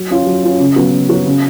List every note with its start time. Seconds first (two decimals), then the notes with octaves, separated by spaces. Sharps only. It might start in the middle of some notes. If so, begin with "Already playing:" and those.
Already playing: F#3
0.10 C#4 F4
0.27 F#3
0.44 C#4 F4
0.60 C#3
0.76 F#3 B3 F#4
0.93 C#3
1.10 F#3 B3 F#4
1.26 C#3